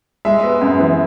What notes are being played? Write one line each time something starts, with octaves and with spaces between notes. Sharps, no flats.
G#3 E5
B3
F#2
E3